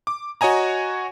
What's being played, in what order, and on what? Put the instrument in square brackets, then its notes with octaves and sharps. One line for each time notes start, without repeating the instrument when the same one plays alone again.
[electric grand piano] D6
F#4 C#5 D#5 G#5 A#5